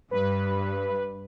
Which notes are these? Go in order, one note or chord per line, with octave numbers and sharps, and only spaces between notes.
G2 B4